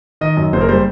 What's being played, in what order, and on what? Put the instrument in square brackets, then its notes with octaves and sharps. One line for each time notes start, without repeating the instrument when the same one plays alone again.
[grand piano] D#3 D#5
F#2
F#1 C5
A#4
G3 C5